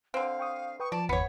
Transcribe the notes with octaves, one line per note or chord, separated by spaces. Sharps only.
D3 C4 F5
G5 C#6 D#6
B4 G5 C#6 D#6
F3 D5 A5
G1 E2 B3 C#5 B5 C#7